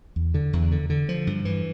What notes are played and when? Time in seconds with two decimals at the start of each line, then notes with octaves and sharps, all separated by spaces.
0.16 E2
0.34 D3
0.53 E2
0.72 D3
0.90 D3
1.09 F3
1.27 G2
1.45 E3